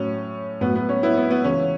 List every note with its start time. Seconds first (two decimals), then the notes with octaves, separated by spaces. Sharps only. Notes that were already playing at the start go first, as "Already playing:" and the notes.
Already playing: A2 F#3 C#4
0.61 A2 F#3 B3
0.75 B3
0.89 C#4
1.03 B3 E4
1.17 B3
1.31 B3
1.44 C#2 C#3 E3 C#4